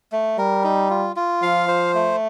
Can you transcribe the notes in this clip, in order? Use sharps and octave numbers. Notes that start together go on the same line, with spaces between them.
A3
G3 A#4
D#4
F4
F4
F3 F5
C5
A3